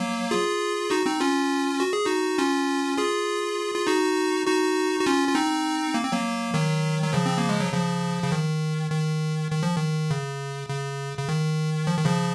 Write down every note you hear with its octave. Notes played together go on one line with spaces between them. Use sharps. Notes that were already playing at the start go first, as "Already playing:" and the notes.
Already playing: F#3 A#3
F4 G#4
D#4 F#4
C4 D#4
C#4 F4
F#4
G#4
D#4 F#4
C#4 F4
F4 G#4
F4
D#4 F#4
D#4 F#4
F#4
C#4 F4
F4
C4 D#4
A#3
C4
F#3 A#3
D#3 F#3
F#3
C#3 F3
C4
A#3
G#3
F#3
C#3 F3
C#3
D#3
D#3
D#3
F3
D#3
C#3
C#3
C#3
D#3
F3
D#3
C#3 F3